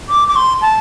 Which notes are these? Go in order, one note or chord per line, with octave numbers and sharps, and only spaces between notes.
D6
D6
C6
A5